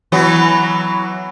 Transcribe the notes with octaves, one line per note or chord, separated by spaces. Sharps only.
E3 F#3 B3